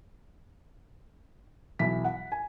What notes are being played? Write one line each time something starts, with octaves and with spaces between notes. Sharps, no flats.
B1 E3 B6
F#5
G#5